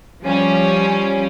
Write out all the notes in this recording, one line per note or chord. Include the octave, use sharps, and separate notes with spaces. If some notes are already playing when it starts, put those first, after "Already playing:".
F3 G3 C#4